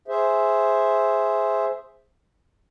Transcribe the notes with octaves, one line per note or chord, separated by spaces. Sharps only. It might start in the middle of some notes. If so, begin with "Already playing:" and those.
G#4 C5 E5